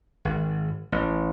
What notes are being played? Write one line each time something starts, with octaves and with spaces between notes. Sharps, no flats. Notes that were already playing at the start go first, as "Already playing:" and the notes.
G#1
A1